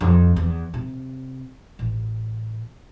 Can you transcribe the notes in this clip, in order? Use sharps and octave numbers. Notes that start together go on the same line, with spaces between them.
F2
E2
C3
A1